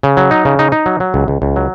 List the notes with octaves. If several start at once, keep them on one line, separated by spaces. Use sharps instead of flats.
C#3
F#3
D#4
C#3
D#4
D#4
F#3
F#3
C#2
C#2
C#2
F#3